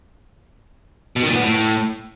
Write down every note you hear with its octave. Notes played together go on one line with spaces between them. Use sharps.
B2
D#3
A#2
B3
A2